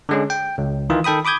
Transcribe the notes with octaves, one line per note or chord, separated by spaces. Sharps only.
D3 G#3 C#4
G5
C#2
D#3 E3 F4
D#3 A4 G5 B5 D#6
B5 D6 D#6 G6 G#6